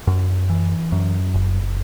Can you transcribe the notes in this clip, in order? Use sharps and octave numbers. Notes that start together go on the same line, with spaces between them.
F#2
E3
F#2
F#1